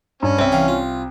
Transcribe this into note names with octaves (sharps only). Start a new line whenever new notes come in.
G2 C#4
C2 C4 E5
E3 F5 G5
F4